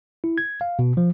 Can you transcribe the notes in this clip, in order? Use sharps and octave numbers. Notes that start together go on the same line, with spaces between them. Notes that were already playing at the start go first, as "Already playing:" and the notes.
E4
G#6
F5
B2
F3